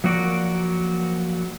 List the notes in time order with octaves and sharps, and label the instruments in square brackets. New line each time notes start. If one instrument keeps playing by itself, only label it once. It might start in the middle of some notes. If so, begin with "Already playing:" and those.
[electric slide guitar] F3 F#3 A#3 F#4 A#4 D5